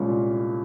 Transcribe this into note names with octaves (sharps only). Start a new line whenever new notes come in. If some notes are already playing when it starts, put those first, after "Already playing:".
Already playing: C2 A#2 G#3 C#4 F4 C#5